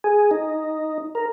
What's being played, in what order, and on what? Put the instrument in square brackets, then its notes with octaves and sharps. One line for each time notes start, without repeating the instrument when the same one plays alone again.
[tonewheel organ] G#4
D#4
A#4